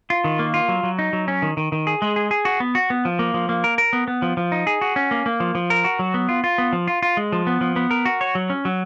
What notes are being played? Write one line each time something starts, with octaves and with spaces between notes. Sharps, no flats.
F4
D#3
A#3
F4
F#3
F#3
D#4
F#3
C#4
D#3
D#3
D#3
G#4
G#3
G#4
G#4
F#4
B3
F#4
B3
F3
A#3
F3
A#3
A#4
A#4
B3
B3
F3
F3
D#4
G#4
F#4
C#4
A#3
A#3
F3
F3
A#4
F#4
F#3
B3
F4
F4
B3
F3
F4
F4
G#3
F3
B3
F3
B3
A#4
F#4
C#5
F#3
C#4
F#3